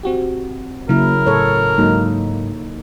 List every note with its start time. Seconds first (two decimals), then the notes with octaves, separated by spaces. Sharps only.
0.03 C4 F#4 G4
0.89 C#3 F#3 A#3 E4 A#4
1.26 A2 A4 C#5
1.78 G#2 F#3 A#3 D#4